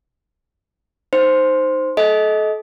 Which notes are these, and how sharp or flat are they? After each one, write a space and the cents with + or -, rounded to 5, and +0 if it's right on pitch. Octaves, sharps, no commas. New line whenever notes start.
D#4 +0 C5 +0
A4 -30 D#5 +25